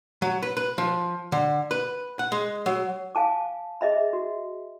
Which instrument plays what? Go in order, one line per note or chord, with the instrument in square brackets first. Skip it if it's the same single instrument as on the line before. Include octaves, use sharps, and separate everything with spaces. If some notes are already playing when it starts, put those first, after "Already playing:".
[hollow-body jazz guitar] F#3
B4
B4
F3
D3
B4
F#5
G#3
F#3
[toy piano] F5 G#5 A5 D6
G#4 D#5 E5 B5
F#4